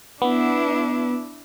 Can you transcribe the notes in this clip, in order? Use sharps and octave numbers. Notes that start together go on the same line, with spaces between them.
B3 D4 E4